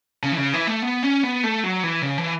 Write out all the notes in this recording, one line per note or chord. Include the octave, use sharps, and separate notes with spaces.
C#3
E3
C#3
E3
A3
B3
C#4
B3
A3
F#3
E3
C#3
E3